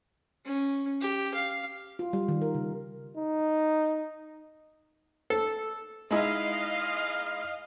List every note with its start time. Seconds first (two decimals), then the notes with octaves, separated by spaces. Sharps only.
0.45 C#4
1.01 G4
1.34 F5
1.99 F4
2.13 G3
2.28 D#3
2.41 A#4
2.55 C#3
3.17 D#4
5.30 A4
6.11 G#3 D#4 E4 D#5 F5